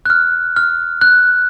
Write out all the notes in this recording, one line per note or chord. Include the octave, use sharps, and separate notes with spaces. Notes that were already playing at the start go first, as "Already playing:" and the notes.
F#6
F6
F6
F#6